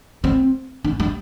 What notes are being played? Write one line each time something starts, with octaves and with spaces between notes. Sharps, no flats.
C4
D4
G3